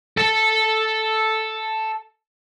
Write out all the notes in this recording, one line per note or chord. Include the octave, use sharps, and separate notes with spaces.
A4 A5